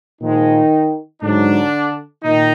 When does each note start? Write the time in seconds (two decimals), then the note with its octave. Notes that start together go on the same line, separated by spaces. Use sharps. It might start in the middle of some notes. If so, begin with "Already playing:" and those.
0.21 A#2 D#3 F3 G#3 D#4
1.23 G#2 D3 F#3 D4
2.24 A#2 D#3 D#4